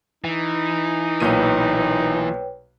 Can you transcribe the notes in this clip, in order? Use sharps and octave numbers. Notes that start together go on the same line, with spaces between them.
E3 D#4
B1 A#2 B4 C#5 G5 D#7